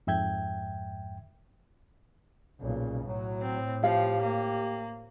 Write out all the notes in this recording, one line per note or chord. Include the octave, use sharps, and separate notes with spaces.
F2 G#2 E5 G5 G6 G#6
B1 A#2 C#3
A2 F#3
C4
F3 G4 F5
A#3